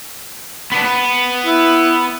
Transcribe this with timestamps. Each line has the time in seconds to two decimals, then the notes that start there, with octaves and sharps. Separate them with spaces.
0.72 B3 D4
0.84 B3
1.45 E4